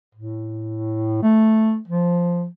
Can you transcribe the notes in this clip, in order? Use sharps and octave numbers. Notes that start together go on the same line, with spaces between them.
A2
A3
F3